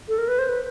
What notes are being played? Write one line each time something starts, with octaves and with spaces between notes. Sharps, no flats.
A4
A#4
B4
C5
B4